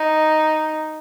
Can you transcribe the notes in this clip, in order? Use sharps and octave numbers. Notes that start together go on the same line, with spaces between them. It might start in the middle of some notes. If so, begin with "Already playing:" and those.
Already playing: D#4